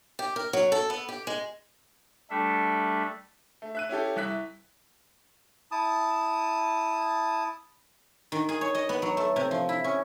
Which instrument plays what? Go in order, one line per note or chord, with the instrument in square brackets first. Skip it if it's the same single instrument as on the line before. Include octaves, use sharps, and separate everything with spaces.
[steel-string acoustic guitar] G4
A#4
F#3
A4
B3
G4
G#3
[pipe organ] G3 A3 D4 A4 E5
[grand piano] A3
E5 F#6 D#7
C#4 E4 G4 A4
C2 E5 F#6 B6
[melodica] E4 A5 D#6
[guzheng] D#3
G#4
C#5
D#5
B3
F#3
A3
C3
F3
E4
C#4